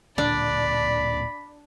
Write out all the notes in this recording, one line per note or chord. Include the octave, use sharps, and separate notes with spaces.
D1 A#2 D3 D4 D5 B5